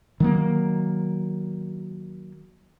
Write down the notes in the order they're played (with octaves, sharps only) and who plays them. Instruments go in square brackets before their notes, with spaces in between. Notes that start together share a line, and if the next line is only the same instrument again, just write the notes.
[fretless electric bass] D#3 F#3 A#3